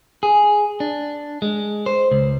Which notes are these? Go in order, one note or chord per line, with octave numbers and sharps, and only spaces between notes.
G#4
D4
G#3
C5
C#2